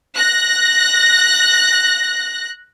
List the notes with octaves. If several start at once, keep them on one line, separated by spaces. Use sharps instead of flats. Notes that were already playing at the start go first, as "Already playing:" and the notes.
F#6 A#6